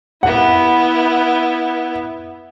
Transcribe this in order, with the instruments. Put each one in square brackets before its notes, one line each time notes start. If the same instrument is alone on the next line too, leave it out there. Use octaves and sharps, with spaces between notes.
[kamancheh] B3 E4 [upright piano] F#5